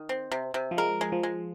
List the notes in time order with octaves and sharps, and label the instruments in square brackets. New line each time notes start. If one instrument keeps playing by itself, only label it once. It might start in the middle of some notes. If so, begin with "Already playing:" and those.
Already playing: [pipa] D#3
C4
C3
C3
[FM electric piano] F3
[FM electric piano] G#3 [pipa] A#4
[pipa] G#3
[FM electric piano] F3
[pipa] G#3